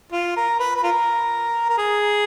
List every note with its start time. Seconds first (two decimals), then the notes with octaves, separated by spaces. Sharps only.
0.12 F4
0.37 A#4
0.60 B4
0.76 B4
0.83 F4 A#4
1.69 A#4
1.78 G#4